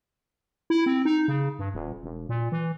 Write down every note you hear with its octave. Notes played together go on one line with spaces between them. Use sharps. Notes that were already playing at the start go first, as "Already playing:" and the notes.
E4
C4
D#4
C#3
G2
D#1
E1
A#2
E3